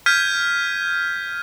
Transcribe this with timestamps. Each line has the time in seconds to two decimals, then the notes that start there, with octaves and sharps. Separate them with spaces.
0.06 F6 G6 G#6 B6 D#7